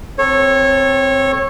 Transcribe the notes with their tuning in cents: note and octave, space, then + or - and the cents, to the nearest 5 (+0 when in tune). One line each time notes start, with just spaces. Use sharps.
C4 +0 A4 +0 C#5 -20